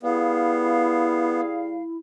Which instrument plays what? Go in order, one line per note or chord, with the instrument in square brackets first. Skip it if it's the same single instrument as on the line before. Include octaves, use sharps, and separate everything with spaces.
[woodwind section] G3 G#4 F5 [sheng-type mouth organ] B3 [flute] E4